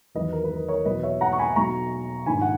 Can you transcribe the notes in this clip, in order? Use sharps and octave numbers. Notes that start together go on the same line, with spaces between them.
E2 D#3 F#3 B4 D#5
A#4
B4
A#4
A#4 C#5
E2 B2 F#3 B4 D#5
C#5 E5
F#5 A#5
C#6
G#5 B5
B1 B2 F#3 A#5 C#6
A#1 G#2 D#3 G#5 B5
F#5